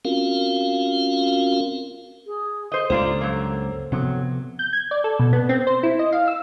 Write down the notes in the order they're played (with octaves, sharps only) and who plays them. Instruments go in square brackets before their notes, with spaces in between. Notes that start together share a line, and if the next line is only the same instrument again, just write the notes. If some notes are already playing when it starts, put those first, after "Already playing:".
[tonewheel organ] C4 C#4 F4 F#4 A#4 F5
[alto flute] G#4
[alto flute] A4 [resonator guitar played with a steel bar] C5 D#5
[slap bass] C#2 G2 [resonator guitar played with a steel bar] A#3 F4 D5 [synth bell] C5
[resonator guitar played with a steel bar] F#3 A#3
[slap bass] C3 F3 B3 [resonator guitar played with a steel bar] F#3
[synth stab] G6
G#6
D5
A4
B2
B3
C4
C5
E4
D#5
F5
E6